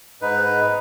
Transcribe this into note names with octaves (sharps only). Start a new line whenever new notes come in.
G#2 D#4 B4